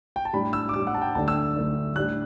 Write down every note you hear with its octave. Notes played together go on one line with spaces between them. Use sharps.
G5
A5
A2 G3 D4 B5
E6
D6
A2 G3 D4 E6
F#5
A5
G5
D2 D3 A3 D4 A5
E6
D2 D3 A3 D4
A2 G3 D4 F#6